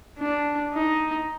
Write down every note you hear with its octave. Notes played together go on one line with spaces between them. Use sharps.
D4
D#4